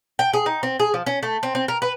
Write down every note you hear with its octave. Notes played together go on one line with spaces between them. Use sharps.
G5
G#4
D#4
C4
G#4
F3
C#4
A3
C4
C4
A#4
B4